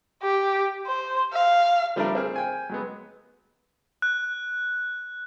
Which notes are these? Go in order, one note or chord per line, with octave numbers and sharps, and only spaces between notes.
G4
C5
F5
F3 G3 A3 C4 D4 A#4
C4 G#4 F6
G5 G#5
F#3 G#3 B3
F#6